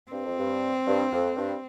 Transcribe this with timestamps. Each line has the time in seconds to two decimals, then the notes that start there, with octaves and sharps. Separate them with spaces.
0.11 G2 C4
0.25 F2
0.38 G2
0.87 G2
1.12 F2
1.36 G2